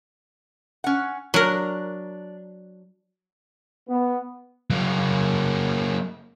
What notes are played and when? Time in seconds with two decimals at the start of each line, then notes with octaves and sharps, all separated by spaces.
0.84 C#4 F#5
1.34 F#3 D4 A#4
3.88 B3
4.70 F#3 A#3